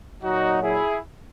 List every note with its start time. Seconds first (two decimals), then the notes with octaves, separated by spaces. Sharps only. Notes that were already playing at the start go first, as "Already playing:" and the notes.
0.23 A#2 F#3 D#4 F#4
0.62 E4 G#4